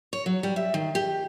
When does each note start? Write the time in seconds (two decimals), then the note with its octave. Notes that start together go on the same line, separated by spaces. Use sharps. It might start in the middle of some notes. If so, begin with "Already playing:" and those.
0.13 C#5
0.26 F#3
0.43 G3
0.56 E5
0.74 D#3
0.95 G4